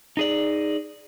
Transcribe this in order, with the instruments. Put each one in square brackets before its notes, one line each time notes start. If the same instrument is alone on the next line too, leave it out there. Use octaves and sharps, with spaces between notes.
[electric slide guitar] D#4 G#4 D5